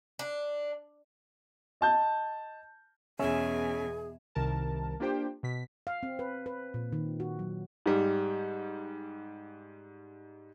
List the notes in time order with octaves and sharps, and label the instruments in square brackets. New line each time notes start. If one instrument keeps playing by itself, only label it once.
[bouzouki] D4
[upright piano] D#5 A5 G6
[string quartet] E2 B2 G#5 [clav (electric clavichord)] C#4 [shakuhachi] G#4 [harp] E5
[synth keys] C2 C3 D#3 A#4 A5
A#3 D4 F4 G4 C5 G5
B2 B6
[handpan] F5
C4
B4
B4
A#2
D#3
F#4
F#3
[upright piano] G#2 G3